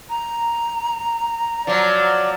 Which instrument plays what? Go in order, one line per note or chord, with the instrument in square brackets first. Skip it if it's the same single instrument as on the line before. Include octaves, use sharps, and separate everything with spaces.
[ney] A#5
[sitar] F3 F#3 [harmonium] D5